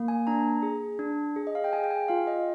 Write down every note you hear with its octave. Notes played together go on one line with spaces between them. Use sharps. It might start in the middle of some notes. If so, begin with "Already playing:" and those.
Already playing: A#3
G#5
D4 A#5
G#4
D4
G#4
D#5
F5
G5
G#4 G#5
G5
G#5
F4 F5
D#5